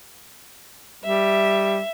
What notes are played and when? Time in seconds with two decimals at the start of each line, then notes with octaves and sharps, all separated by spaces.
1.04 G3 E5